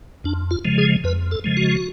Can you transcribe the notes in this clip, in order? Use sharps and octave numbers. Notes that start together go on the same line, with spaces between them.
F2 D4
F4
C#3 F3 G#3
G#4
F2 B4
A4
C#3 F3 G#3
F#4